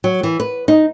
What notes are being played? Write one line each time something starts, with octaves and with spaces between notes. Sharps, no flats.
F#3
E3
B4
D#4